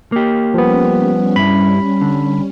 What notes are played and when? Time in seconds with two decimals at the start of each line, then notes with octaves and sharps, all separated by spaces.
0.12 A#3 G4
0.54 F3 G3 B3 C#4
1.36 G2 E4 B5
2.01 D3